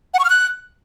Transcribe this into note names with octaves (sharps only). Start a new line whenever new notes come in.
F#5
C#6
F6
F#6